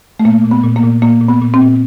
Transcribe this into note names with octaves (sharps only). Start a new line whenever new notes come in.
A3
A#2 A#3
A#2
B3
A#2
A#3
A#2
A#2 A#3
A#2
B3
A#2
C4
A#2